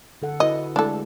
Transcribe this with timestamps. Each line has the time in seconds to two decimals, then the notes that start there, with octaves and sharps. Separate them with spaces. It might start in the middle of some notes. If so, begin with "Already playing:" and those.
0.22 D3 A4 F#5
0.40 E4 F#4 B4 D#5
0.76 G#3 A3 D4 E4 A4